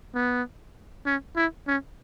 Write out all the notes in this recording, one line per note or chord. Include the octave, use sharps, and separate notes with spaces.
B3
C#4
E4
C#4